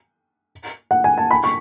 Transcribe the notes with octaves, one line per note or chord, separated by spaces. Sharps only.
F#5
G#5
A5
B5
C#6